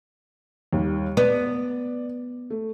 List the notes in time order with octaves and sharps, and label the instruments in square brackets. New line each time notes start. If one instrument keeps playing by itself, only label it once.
[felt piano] D#2 G3
[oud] B3 [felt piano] D5
[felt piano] A3